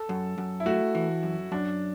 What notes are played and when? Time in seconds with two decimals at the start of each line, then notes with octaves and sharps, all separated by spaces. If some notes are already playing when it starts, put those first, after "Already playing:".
Already playing: A4
0.09 F#2
0.38 F#2
0.60 E4
0.66 A3 F#4
0.95 E3
1.23 F#2
1.51 F#2 D4